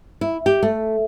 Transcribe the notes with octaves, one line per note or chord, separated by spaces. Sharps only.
E4
G4
A3